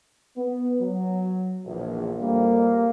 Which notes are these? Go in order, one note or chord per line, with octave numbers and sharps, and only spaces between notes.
B3
F#3
A#1 E2
F2 G3 A#3